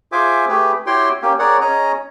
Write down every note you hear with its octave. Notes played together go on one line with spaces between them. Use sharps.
F4 G#4 C5 E5 G#5 D6
A3 G4 G#4 B4
E4 F#4 G4 C#5 G5 C6
A#3 C#4 G4
G#4 A#4 C#5 D5 F#5
C#4 G#4 C#5 D#5 A#5